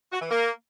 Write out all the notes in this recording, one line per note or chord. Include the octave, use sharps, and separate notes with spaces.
F#4
E3
A#3